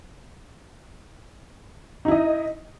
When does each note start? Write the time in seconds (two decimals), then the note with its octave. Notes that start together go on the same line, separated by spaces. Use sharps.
2.05 D#4
2.08 E4
2.11 D#5